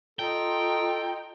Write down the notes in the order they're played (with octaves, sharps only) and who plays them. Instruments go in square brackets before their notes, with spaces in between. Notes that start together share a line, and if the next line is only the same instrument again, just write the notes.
[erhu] D#4 [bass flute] F4 [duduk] A4 [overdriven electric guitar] G5